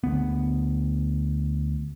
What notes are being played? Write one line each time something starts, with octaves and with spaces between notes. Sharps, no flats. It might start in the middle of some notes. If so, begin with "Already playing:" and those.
D2 B3